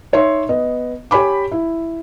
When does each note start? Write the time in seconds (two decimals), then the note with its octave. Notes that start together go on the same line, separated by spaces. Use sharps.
0.13 D#4 C#5 E5 C6
0.49 B3 D#5
1.11 G4 C#5 G#5 B5 D6
1.52 E4